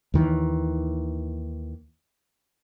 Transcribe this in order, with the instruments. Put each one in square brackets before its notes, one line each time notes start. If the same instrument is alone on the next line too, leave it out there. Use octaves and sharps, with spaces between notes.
[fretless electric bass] D#2 D#3 E3